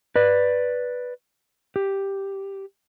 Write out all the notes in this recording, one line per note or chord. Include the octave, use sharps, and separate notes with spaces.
B4 D5
G4